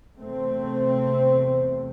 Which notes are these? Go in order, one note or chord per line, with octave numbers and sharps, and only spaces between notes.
E2 C3 A3 C4